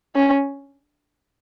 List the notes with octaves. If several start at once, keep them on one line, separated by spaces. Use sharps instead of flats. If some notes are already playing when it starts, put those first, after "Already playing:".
C#4